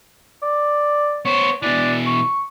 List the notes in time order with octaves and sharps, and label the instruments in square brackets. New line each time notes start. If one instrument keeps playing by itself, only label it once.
[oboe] D5
[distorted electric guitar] B3 C5 [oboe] C#5
[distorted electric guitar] B2 E3 [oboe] D4
[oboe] C#6